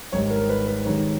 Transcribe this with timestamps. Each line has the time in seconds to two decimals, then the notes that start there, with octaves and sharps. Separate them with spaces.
0.12 G#1 G#2 D#3 G3 C#5
0.30 A#4
0.49 B4
0.67 B4
0.85 G#1 G#2 D#3 G3 C#5